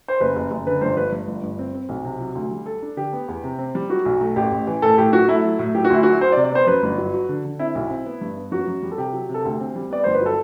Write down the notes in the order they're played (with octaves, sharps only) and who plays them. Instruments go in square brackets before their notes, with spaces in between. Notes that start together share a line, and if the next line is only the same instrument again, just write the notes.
[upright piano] C5
[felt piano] F#1 [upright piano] B4
[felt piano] F#1
F#1
[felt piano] D3 [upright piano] B4
[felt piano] G1 [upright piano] C5
[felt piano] G2 [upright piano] B4
[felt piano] G2
G1
G2
C4
C4
B1
C3
F#3
D2
G3
A4
D4
[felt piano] D3 [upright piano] G4
[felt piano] B3
E2
C3
C4
G3
[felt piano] F#3 [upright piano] F#4
[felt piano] B1
A3
[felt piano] A1 [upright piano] G4
[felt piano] A1
E3
[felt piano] A2 [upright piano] A4
[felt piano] A2 [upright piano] G4
[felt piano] F#3 [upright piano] F#4
[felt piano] A3 [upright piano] E4
[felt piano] F#3
A2
[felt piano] F#3 [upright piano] G4
[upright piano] F#4
[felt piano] D2 [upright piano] E4
[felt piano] F#3 [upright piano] F#4
[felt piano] F#4 [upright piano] C5
[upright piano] D5
[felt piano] C3
[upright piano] D5
[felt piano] B3 [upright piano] C5
[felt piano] F#2 [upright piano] B4
[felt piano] G1
F#3
F#4
D3
D3
[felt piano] C4 [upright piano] E4
[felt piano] B1
C4
B3
G2
B3
[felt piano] F#2 [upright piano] F#4
[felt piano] F#2
G3
[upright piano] A4
[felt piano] C3 [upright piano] G4
[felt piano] F#3
C3
[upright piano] A4
[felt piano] D2 [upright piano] G4
[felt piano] C4
G3
[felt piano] B3 [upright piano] D5
[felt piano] G1 [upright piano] C5
[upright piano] B4
[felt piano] F#3 [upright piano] A4